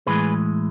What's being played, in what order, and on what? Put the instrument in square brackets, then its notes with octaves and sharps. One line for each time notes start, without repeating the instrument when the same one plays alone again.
[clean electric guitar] A2 E3 G#3 G#4 B4